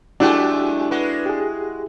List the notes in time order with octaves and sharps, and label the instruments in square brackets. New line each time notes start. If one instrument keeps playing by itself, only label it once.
[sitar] F#3 G#3 A3 [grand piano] D4 [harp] E4 [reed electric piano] F#4 G4 G5
[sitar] G#3 F#4 [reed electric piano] B4
[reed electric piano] G4 G#4